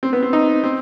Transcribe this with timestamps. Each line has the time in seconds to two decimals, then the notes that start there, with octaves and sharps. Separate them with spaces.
0.03 C4
0.13 B3
0.23 C4
0.33 D#4
0.64 C4